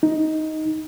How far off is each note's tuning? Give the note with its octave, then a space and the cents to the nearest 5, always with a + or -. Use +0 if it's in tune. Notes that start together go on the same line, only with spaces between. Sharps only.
D#4 +10